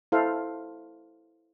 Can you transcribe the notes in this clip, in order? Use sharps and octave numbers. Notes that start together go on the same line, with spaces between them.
E4 A4 C5 F5